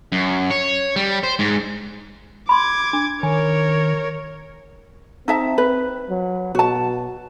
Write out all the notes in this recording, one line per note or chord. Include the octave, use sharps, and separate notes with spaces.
F#2
C#5
G3
C5
G#2
B5 C6 D6 G#6
D4
D#3 A#4 C#5 G#5
C4 D#4 E5 A5
B4
F#3
B2 F#4 A5